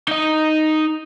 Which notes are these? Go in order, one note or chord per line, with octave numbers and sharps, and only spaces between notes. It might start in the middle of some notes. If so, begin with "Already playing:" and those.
D#4 D#5